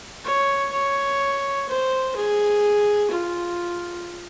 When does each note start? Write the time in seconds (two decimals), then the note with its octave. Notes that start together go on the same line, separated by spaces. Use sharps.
0.25 C#5
0.73 C#5
1.69 C5
2.16 G#4
3.11 F4